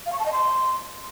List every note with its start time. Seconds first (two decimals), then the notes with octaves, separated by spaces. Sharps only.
0.06 F5
0.13 C#6
0.19 A5
0.26 D#5
0.33 C6